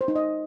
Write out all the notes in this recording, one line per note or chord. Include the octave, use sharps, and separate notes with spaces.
C5
D#4
D#5